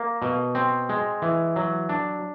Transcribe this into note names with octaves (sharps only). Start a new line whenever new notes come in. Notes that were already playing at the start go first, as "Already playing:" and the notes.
Already playing: A#3
B2
C4
G#3
E3
F#3
D4